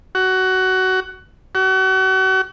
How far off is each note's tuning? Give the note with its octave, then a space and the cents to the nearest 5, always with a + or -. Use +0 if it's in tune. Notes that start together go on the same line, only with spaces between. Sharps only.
F#4 +15
F#4 +35